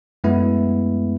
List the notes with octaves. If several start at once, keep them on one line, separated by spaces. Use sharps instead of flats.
F#2 G#3 A3 B3 E4